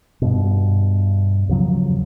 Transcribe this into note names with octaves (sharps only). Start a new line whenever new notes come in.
G2 B2
D#2 C#3 F3 F#3